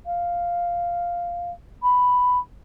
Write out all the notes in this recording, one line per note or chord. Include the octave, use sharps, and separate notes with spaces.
F5
B5